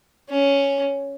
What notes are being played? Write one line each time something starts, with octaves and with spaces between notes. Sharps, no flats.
C#4